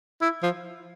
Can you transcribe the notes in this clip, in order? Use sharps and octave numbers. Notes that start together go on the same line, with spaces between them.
E4
F3